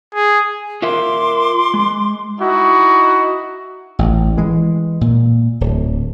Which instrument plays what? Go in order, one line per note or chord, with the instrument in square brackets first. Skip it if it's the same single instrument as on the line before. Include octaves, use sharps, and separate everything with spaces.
[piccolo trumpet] G#4
[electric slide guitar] F4 A#4 E5 [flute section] C6 D6
[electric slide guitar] G#3
[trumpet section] D#4 E4 F#4
[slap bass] A1
E3 G#3
A#2
D1